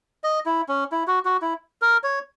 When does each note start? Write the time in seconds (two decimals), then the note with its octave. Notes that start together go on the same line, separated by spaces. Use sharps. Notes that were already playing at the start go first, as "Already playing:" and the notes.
0.24 D#5
0.46 E4
0.68 C#4
0.92 E4
1.07 F#4
1.25 F#4
1.42 E4
1.82 A#4
2.03 C#5